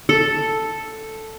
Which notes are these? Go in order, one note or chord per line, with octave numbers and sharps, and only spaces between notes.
A4